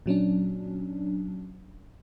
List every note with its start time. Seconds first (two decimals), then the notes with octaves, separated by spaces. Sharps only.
0.06 A#2 F#3 C#4 D4